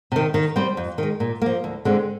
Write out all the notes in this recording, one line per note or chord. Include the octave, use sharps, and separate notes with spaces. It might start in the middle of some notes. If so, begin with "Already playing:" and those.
C3 D#3
D#3
G3 C4 G4 C5
F2
D#3 G#3
A#2
F3 A#3
D2
D3 G#3 C4